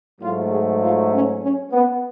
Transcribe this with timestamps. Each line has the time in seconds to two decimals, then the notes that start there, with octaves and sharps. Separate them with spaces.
0.20 G#2 F#3 A3 F4
0.50 G#4
0.81 F4
1.10 C#4
1.41 C#4
1.72 B3